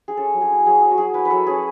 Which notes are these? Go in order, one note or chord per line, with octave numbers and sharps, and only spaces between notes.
G#4
C#4 A4
F#3
G#4
E4
F#3 G#4
C#4 G#4
F#4
F#3 G#4
E4 B4
B4
F#3 A4
C#4 G#4